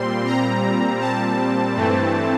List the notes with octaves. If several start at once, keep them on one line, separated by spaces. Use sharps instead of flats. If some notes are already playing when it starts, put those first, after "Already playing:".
Already playing: A#2 G3 C4 C6
A#5
A5
G2 E3 A3 C4